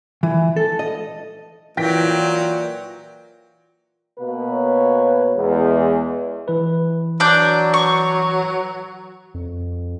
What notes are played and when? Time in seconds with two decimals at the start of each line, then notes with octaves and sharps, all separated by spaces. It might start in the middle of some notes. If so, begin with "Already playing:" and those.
0.23 E3
0.56 A4
0.79 D#5
1.77 A#2 E3 F#3 G5 A#6 B6
4.17 B2 A#3 B4
4.49 C#5
5.37 E2 G#3
6.48 E3 B4
7.20 F#3 D4 D6 G6
7.74 C#6
9.34 F2